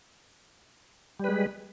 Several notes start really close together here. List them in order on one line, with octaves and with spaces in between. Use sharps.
G3 B4 G#3